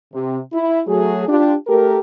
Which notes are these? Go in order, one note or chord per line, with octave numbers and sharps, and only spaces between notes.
C3
E4
F#3 A3 G#4
D4 F4 G4
A3 G4 A4 A#4